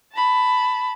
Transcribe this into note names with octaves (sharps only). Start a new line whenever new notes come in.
A5 B5